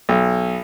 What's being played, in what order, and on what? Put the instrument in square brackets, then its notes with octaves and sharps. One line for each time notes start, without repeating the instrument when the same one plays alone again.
[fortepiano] B1